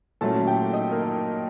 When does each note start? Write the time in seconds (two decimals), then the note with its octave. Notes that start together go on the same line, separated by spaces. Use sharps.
0.21 A#2 F#3 A3 C#4 E4 A4 A5
0.47 G4 G5
0.73 D#4 D#5
0.91 A#3 A#4